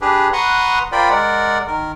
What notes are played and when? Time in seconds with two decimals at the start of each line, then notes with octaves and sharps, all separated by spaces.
0.01 D4 G4 G#4 B4
0.33 B4 F#5 A#5 C6 C#6 D#6
0.92 F4 A#4 C5 D5 G5 B5
1.10 G#3 A#4 D5 F#5
1.67 D#3 A#4